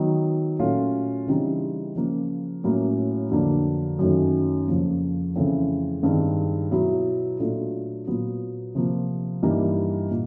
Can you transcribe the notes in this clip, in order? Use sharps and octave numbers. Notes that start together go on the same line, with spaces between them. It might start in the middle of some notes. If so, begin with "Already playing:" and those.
Already playing: D#3 F#3 B3
A#2 F#3 A3 C#4 F4
C#3 E3 G3 C4 D#4
C#3 F3 A#3
A2 F#3 A#3 C#4 E4
F2 D3 F#3 A#3 D4
F#2 D#3 F#3 A3 C#4
F2 C#3 F3 A#3
F2 C#3 E3 A3 C4
G2 D#3 G#3 C4
B2 F#3 B3 E4
A#2 F#3 A3 D4 F4
A#2 F#3 B3
C3 F3 A#3
G2 E3 G3 A#3 D#4
A#2